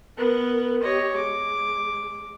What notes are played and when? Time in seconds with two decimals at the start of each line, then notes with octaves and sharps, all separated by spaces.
0.18 B3 A#4 B4
0.82 G4 C#5 D#5
1.16 G#3 D6